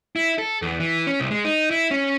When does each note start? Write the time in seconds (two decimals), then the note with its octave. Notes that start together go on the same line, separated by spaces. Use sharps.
0.16 E4
0.38 A4
0.62 E2
0.80 E3
1.07 C#4
1.20 C2
1.31 G#3
1.45 D#4
1.71 E4
1.91 C#4